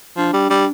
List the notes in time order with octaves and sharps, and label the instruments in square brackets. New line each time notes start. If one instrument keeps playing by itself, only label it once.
[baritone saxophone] F3 [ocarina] D4
[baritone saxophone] G3
G3